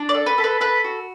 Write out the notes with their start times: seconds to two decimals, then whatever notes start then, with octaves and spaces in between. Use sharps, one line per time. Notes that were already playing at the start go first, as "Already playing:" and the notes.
Already playing: D4
0.09 D5
0.14 A4
0.26 B4
0.38 A4
0.44 B4
0.61 A4 B4
0.84 F#4